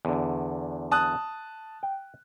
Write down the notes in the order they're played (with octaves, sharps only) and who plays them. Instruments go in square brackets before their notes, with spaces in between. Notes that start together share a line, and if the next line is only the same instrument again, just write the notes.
[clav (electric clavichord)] E2 D3
[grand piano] A5 D#6 F#6
[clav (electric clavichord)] G5